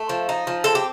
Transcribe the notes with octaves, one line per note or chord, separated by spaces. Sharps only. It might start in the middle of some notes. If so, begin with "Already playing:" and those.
Already playing: A3
F3
D#4
F3
C4 A4
G4